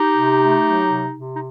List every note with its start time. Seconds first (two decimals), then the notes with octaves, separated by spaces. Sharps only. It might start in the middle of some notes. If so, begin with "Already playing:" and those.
Already playing: D#4 G4
0.15 C3
0.39 A3
0.64 F#3
0.89 C3
1.14 C3
1.34 D#4